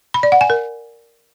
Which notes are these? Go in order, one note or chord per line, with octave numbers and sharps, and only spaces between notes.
B5
D5
F#5
G#5
A#4